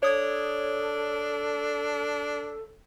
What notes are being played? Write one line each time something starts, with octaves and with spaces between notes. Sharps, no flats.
D4 A4 C#5 D#6 G#6